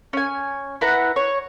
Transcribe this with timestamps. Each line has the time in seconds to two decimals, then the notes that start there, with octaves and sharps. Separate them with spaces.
0.13 C#4 G#5
0.81 E4 B4 F#5 A#5
1.16 C#5